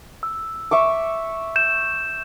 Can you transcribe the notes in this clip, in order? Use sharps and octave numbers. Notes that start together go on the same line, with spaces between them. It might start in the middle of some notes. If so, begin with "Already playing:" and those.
E6
E5 C#6 D6
G6 E7